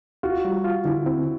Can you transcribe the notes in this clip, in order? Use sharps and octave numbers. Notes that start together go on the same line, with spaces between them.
F4 F#4
G3
F4
D3 E4
C4